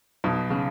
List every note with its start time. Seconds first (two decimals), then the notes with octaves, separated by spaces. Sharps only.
0.24 B1 B2
0.50 C#3